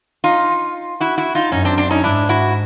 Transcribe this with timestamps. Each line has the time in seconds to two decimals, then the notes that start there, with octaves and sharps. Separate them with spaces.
0.24 D#4 F4
1.00 E4 F#4
1.18 E4 F#4
1.35 D#4 F4
1.52 F#2 C#4 D#4
1.65 C4 D4
1.77 C4 D4
1.90 C#4 D#4
2.03 G#2 D4 E4
2.29 E4 F#4